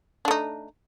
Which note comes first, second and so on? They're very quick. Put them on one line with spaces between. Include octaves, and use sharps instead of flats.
D4 A3 D#4